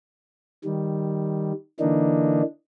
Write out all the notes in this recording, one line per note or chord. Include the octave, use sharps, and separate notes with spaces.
D#3 G3
D3 E3 A#3 D4 D#4